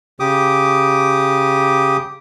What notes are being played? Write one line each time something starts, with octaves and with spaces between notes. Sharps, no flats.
C#3 G4 D6 D#6